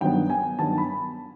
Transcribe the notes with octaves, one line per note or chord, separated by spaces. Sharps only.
G2 D#3 F#3 B3 G5
G#5
G2 D#3 F#3 B3 A5
B5